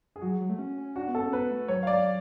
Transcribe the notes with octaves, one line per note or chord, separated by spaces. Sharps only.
G#4
F#3 F#4
F#3
A3
C#4
C#4
D4 F#4
B3
A4
C#4
B3 B4
A3
F#3 C#5
F5
D5